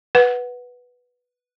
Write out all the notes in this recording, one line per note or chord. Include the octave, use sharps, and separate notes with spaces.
B4 F#5